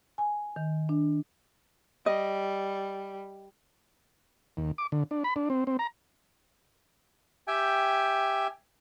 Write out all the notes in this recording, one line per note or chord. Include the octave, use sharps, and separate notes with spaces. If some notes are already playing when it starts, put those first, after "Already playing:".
G#5
D#3
D4
G3 D#5
D#2
D6
D3
D4
B5
D4
C4
C4
A#5
G4 E5 G5 G#5